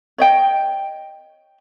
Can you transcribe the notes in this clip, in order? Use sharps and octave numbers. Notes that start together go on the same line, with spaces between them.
C#5 D#5 G5